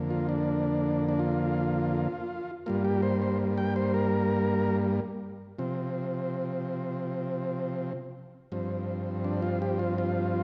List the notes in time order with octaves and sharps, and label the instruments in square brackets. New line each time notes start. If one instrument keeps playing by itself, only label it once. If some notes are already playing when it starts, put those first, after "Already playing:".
Already playing: [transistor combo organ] F2 D3 A#3
F4
D4
D4
F4
G2 G3 A#3 F4
G4
C5
C5
G5
C5
A#4
C3 F3 C4
G2 F3 C4
D4
F4
G4
F4
F4